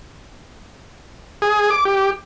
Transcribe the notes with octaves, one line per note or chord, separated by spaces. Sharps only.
G#4
D6
G4